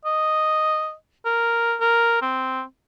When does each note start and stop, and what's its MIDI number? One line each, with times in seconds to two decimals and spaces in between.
0.05 0.93 75
1.25 1.75 70
1.81 2.21 70
2.22 2.63 60